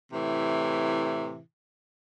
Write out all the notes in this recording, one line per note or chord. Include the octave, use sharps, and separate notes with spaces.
A2 C3 E3